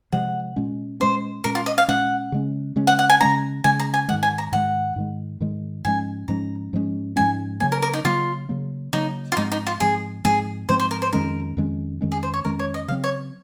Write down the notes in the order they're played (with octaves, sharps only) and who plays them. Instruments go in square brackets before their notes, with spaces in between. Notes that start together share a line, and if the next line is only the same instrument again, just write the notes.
[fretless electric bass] C3 F3 G#3 [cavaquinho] F#5
[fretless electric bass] A#2 G#3 C#4
[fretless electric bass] A#2 G#3 C#4 [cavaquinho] C5
[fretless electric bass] A#2 G#3 C#4 [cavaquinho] A#4
[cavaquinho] F4
D#5
F5
[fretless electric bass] A#2 G#3 C#4 [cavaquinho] F#5
[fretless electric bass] C#3 G#3 C#4
C#3 G#3 C#4
[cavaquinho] F#5
F#5
G#5
[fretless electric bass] C#3 G#3 C#4 [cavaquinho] A#5
[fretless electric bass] C#3 G#3 C#4 [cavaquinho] G#5
[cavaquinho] A#5
G#5
[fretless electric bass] G#2 D#3 G#3 [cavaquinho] F#5
[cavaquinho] G#5
A#5
[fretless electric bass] G#2 D#3 G#3 [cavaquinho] F#5
[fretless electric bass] G#2 D#3 G#3
G#2 D#3 G#3
[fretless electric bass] G#2 F3 G#3 C#4 [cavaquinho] G#5
[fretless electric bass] G#2 F3 G#3 C#4 [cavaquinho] A#5
[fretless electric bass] G#2 F3 G#3 C#4
[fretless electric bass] G#2 F3 G#3 C#4 [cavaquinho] G#5
[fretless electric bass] C#3 F#3 A#3 [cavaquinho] G#5
[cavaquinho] A#4
A#4
D#4
[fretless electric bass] C#3 F#3 A#3 [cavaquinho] F4
[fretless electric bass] C#3 F#3 A#3
[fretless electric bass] C#3 F#3 A#3 [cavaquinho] D#4
[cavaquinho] F4
[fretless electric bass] G#2 F3 G#3 C4 [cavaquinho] D#4
[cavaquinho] D#4
F4
[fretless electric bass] G#2 F3 G#3 C4 [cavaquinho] G#4
[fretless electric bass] G#2 F3 G#3 C4 [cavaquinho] G#4
[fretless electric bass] G#2 F3 G#3 C4 [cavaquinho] C5
[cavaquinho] C5
A#4
C5
[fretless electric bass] F2 D#3 G#3 C#4 [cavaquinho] A#4
[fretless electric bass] F2 D#3 G#3 C#4
F2 D#3 G#3 C#4
[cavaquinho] G#4
C5
C#5
[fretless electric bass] F2 D#3 G#3 C#4 [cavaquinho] A#4
[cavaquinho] C#5
D#5
[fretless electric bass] C#3 F#3 C4 [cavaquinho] F5
[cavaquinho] C#5